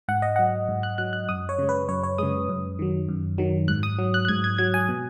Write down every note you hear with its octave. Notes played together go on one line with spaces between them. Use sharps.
G#2 F#5
D#5
F#3 F#5
G#2
F#6
F#3 F#6
F#6
F#2 D#6
C#5
C#3 G#3
B4
F#2 C#5
C#5
C#3 G#3 D#6
F#2
D#3 F#3
F#2
D#3 F#3
G#2 F#6
D#6
F#3
F#6
F#6
G#2 G#6
G#6
F#3 G#6
G#5
B2